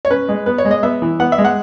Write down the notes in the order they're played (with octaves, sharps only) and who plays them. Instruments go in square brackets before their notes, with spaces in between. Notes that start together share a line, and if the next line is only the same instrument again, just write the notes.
[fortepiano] C#5
C#4 B4
G#3
B3 B4
C#5
G#3
D#5
B3 E5
E3
B3 F#5
E5
G#3
F#5